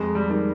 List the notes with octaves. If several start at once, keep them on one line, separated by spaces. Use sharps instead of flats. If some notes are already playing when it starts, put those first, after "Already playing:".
Already playing: F2 G#3
G3
D#3 G3